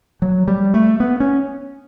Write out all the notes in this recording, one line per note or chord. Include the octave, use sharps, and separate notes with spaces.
F#3
G3
A3
B3
C#4